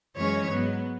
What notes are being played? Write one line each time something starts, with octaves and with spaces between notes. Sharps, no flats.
F#2 E3 G#3 C#4 C#5
G#2 F#3 B3